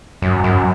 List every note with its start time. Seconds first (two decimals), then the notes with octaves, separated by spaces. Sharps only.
0.22 F#2
0.44 F#2